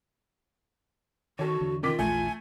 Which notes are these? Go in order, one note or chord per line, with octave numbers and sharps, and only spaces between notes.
D#3 F#4 A4 C#5
E2 D3
D#3 F4 D6 B6
A#1 E2 A3 G#5